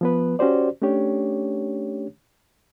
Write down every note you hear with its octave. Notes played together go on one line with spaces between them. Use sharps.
F3 B3 B4
C#4 F#4 G4 C5 D5
A3 C#4 D4 G4 C#5